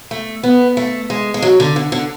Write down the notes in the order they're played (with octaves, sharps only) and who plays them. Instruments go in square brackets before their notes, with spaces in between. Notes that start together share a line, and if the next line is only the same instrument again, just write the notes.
[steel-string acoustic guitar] A3
B3
A3
G#3
G#3
F#3
D3
D3
D3